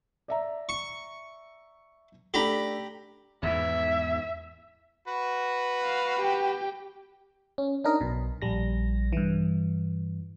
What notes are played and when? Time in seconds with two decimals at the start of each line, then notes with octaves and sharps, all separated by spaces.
0.28 D5 E5 A#5
0.69 C#6
2.34 A3 D4 G4 A4 A#5 B5
3.43 E2 G#2 E3 E5
5.07 F#4 B4
5.83 F5
6.19 G4 G5
7.58 C#4
7.84 D4 D#4 A#4 D#5
8.01 B1 B2
8.42 A#1 G3 A#6
9.13 G2 E3